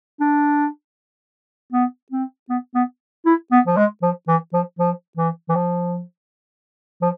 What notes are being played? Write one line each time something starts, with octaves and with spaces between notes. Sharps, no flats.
D4
B3
C4
B3
B3
E4
B3
F3
G#3
F3
E3
F3
F3
E3
E3
F3
F3